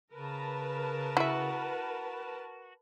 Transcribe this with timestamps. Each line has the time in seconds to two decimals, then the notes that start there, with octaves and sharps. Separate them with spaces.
0.13 C#3 A#4 B4 A5
1.17 E4 F#4 E5